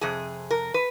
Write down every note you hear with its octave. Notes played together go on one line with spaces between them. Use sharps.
F2 C3 G#4
A#4
B4